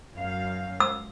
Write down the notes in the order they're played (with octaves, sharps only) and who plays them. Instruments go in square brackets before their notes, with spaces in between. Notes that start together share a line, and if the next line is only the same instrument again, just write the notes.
[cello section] F#2 F5
[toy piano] E6